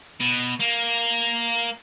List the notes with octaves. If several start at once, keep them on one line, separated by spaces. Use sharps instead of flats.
B2
A#3